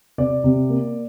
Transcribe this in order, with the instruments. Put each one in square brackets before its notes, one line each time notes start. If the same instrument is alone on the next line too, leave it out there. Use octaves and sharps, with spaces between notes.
[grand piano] C3 D5
C3
A#3